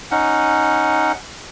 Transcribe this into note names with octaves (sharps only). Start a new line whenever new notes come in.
C#4 D#4 F#5